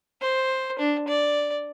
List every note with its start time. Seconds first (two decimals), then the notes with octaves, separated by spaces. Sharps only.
0.21 C5
0.79 D4
1.08 D5